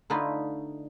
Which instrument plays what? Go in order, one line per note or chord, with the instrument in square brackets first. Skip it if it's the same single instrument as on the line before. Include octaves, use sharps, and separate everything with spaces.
[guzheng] D3 A3 D#4 F4 B4